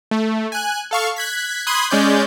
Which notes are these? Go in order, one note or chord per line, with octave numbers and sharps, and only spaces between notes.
A3
G#5 F#6
A4 F5 C#6
F#6 G#6 B6
B5 C6 D#6 F#6 G#6
G#3 C#4 D5 G6